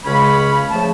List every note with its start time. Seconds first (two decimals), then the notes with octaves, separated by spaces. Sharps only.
0.06 C#2 C#3 G#3 C#4 B5
0.70 C#3 F3 A3 A5